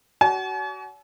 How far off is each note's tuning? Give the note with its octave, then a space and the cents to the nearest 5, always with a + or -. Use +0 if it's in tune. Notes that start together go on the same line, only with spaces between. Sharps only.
F#4 +30 C#5 +45 G#5 +45